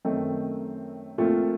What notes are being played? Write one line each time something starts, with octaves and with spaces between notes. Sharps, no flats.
F#2 D#3 A3 C4
A#2 F3 A3 C4 F4